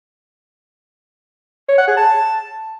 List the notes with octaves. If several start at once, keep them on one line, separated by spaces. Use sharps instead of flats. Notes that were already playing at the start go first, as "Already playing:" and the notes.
C#5
F#5
G#4
A5